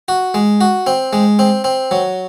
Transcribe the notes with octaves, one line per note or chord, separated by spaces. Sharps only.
F#4
G#3
F#4
C4
G#3
C4
C4
F#3